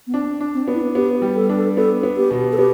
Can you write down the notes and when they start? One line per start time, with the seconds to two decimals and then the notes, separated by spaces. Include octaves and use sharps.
0.07 B3
0.13 C4 D4
0.41 D4
0.54 C4
0.68 B3
0.75 E4
0.95 B3 G4
1.22 G3
1.36 A4
1.49 D4
1.58 A4
1.77 B3 A4
2.03 B3
2.17 G4
2.31 B2
2.52 A4
2.58 B3 G4